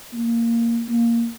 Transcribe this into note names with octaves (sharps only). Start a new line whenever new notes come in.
A#3
A#3